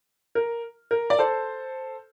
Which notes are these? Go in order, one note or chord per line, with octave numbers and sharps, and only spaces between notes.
A#4
A#4
D5
A4 C5